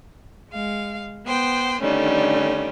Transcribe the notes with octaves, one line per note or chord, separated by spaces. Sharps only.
G#3 F5
B3 C5 G5
D3 D#3 G3 A3 C#4